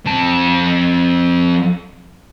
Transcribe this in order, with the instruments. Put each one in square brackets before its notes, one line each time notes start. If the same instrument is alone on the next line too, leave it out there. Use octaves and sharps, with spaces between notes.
[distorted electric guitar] F2 A5